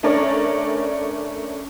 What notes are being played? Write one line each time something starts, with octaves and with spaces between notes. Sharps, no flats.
A3 C#4 D4 A#4 C#5 D5